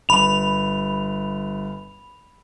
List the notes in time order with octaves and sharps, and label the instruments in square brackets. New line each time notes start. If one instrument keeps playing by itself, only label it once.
[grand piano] G1 [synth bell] B5 F7